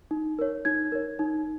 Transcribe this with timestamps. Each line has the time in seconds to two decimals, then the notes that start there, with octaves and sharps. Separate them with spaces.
0.11 D#4
0.39 A#4 C#5
0.65 D#4 G#6
0.92 A#4 C#5
1.19 D#4